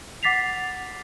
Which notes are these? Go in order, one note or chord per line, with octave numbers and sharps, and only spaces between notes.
F#5 D6 A6 B6 C7 F7